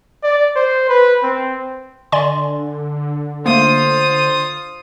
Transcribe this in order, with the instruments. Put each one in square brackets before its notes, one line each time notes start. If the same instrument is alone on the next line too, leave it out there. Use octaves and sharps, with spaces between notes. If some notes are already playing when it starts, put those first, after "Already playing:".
[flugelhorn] D5
C5
B4
C4
[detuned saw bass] D3 [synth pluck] D5 G#5 C6
[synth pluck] A3 A#3 [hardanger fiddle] F4 D#6 [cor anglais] C5